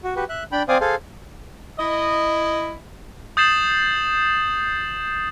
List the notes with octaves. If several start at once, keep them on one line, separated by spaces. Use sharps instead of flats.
F#4
F#4 G4 B4
E5 F#6
D4 G5 B5
C4 C5 D5 F5 G#5 D#6
G#4 A4 C5 F5
E4 D#5
D#6 G6 A6 C7 E7 F#7